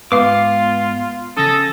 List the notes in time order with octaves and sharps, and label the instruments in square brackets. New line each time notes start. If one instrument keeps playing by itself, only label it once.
[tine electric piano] G#2 G#3 [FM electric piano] B3 [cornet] F4 [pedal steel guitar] F5 D6
[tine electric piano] C#3 F3 C#4 [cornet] A4 [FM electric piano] D#6 G#6 A#6